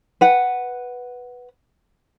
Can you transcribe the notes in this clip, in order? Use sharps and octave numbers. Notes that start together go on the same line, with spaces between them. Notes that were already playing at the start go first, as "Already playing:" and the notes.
B4 F#5